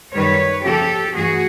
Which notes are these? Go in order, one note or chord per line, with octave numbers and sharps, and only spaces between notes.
F#2 D#3 G3 B4 C#5
C#3 F3 A#3 C#4 G4 A4
G2 E3 A3 F#4 G#4